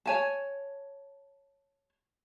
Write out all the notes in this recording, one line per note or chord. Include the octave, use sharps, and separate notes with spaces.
C#5 G#5 A5